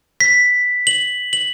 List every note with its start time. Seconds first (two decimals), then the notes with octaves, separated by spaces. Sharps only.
0.21 B6
0.87 F#7
1.33 F#7